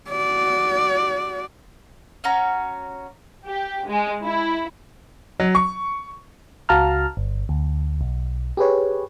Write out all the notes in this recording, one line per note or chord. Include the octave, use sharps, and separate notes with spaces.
F#4 D5
C#4 F#4 A#5
G4
G#3
E4
F#3
C#6
C#2 F#4 F5 A5 A#5 F6
G1
D2
B1
G4 G#4 B4 C#5